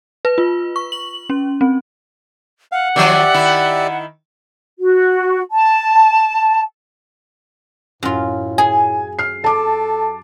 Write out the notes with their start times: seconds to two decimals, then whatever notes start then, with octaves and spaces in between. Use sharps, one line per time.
0.25 B4
0.38 F4
0.76 C#6
0.92 F#7
1.30 C#4
1.61 C4
2.72 F5 F#5
2.96 D#3 F3 F#3 G4 D5 E5
3.34 D#3 E4
4.79 F#4
5.52 A5
8.03 F#2 A2 F4
8.58 G#4 G#5
9.19 F6 C7
9.44 A4 A5 D6